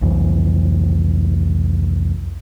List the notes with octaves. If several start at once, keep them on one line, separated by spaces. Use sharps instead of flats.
C2 F2 E3